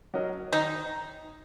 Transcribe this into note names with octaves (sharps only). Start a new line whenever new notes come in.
F#3 C#4 A#4 D#5
D#3 D#4